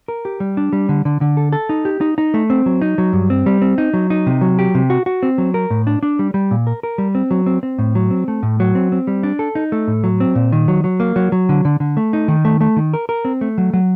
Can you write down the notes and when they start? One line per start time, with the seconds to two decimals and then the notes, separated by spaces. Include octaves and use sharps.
0.08 A#4
0.25 G4
0.40 G3
0.57 D4
0.73 G3
0.89 D3
1.05 D3
1.21 D3
1.37 A4
1.52 A4
1.69 D#4
1.85 G4
2.01 D#4
2.18 D#4
2.34 A3
2.50 C4
2.66 F#3
2.82 D#4
2.98 F#3
3.13 G2
3.30 C4
3.46 G3
3.62 C4
3.78 D#4
3.93 F#3
4.10 D#4
4.27 C3
4.41 F#3
4.59 G4
4.75 C3
4.90 F#4
5.06 F#4
5.23 C4
5.38 F#3
5.54 A#4
5.70 A2
5.87 D4
6.03 D4
6.19 G3
6.34 G3
6.51 A#2
6.67 A#4
6.83 A#4
6.98 G3
7.15 C4
7.31 F#3
7.46 C4
7.63 C4
7.79 A2
7.95 F#3
8.11 C4
8.28 A3
8.43 A2
8.60 F#3
8.75 C4
8.92 C4
9.07 G3
9.23 D4
9.39 A4
9.55 D#4
9.72 A3
9.88 A2
10.04 F#3
10.20 C4
10.35 A#2
10.52 D#3
10.68 F#3
10.84 F#3
11.00 A#3
11.16 F#3
11.32 F#3
11.49 D3
11.65 D3
11.80 D3
11.97 A3
12.13 D#4
12.28 D#3
12.45 A3
12.61 A3
12.77 D#3
12.94 A#4
13.09 A#4
13.25 C4
13.41 A3
13.58 F#3
13.73 F#3